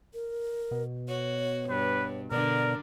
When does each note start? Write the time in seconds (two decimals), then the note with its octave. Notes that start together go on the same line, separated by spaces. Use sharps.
0.14 A#4
0.71 B2
1.08 F#4 C#5
1.70 G2 B4
2.32 B2 D3 D4 A#4 D5